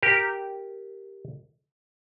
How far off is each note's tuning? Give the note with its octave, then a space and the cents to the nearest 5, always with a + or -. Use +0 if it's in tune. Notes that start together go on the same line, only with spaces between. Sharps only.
G4 +0 A#4 +0